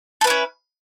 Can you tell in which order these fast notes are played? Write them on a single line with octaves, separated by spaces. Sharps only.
A4 B4 E4 C#4